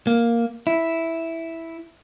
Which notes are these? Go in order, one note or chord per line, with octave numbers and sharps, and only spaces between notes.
A#3
E4